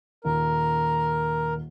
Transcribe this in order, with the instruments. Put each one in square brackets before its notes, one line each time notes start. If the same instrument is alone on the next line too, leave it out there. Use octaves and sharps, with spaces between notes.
[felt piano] D#1 [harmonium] A#4